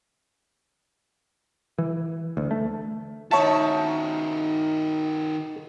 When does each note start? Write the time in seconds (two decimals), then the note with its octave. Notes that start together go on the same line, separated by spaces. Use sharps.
1.78 E3
2.37 D2
2.51 A3
3.31 D#3 D#4 F#4 C#5 E5 A5